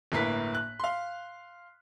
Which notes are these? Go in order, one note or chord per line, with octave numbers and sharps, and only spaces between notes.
G1 A2 A#3 B4 B6
F#6
F5 C6